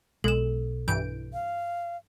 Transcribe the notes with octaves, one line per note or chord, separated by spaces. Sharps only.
B1 G#3 A4 E7
G2 E3 G6 D7
F5